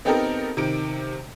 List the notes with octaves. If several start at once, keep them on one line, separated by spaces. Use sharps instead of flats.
B3 C4 D#4 G4 A4 A#4
C3 D#3 D7